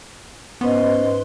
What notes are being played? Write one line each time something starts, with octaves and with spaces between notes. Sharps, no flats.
G#2 B3 C#4 B4 C5 D#5 C6